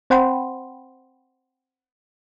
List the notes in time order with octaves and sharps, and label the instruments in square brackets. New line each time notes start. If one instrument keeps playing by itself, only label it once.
[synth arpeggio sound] C4 C5 F#5 G5 B5 C6